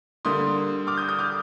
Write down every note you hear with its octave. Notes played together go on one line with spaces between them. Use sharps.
D3 G3 A#3 C6 D#6
D6 F6
D#6 G6
D#6 G6
D6 F6